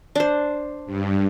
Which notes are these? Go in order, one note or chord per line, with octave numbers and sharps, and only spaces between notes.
D4 C5
G2